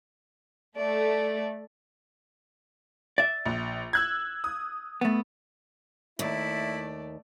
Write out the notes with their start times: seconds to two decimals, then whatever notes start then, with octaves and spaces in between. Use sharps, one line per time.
0.77 A3 D5
3.18 D5 E5
3.46 A#1
3.93 E6 F#6 G#6
4.44 D#6
5.01 A3 B3
6.19 D#2 A3 E4 D5